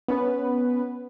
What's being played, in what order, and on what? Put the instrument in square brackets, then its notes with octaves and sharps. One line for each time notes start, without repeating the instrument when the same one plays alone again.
[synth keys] B3 C#4 B4